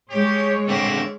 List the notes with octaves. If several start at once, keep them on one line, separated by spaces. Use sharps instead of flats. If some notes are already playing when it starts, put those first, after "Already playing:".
G3 G#3 G4 C#5
D3 C4 A#4 D5 E5